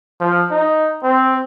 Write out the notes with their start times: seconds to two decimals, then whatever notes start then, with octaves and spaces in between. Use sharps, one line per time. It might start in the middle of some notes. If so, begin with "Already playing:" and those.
0.21 F3
0.51 D#4
1.03 C4